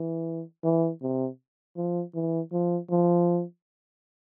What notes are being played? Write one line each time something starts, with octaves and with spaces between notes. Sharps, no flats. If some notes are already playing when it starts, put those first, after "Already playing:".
Already playing: E3
E3
C3
F3
E3
F3
F3